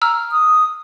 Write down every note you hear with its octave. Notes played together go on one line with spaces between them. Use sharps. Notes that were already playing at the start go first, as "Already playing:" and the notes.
A#5 E6 F6
D#6